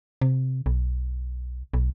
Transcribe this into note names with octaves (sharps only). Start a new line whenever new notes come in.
C3
B1
B1